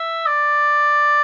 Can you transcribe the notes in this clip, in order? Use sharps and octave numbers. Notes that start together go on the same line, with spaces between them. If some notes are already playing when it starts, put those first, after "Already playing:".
Already playing: E5
D5